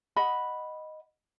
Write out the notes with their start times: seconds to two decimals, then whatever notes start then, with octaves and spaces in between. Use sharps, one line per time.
0.16 D#5 F#5 B5